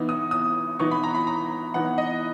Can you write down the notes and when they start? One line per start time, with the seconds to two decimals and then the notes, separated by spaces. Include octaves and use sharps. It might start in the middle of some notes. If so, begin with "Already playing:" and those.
Already playing: E3 B3 D#4
0.09 D#6
0.31 D#6
0.79 E3 B3 D#4 C#6
0.91 B5
1.03 A#5
1.15 B5
1.27 A#5
1.74 E3 B3 D#4 F#5
1.98 D#5